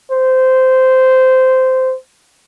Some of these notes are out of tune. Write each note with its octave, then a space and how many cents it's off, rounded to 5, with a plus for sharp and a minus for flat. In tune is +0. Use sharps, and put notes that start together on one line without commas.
C5 -15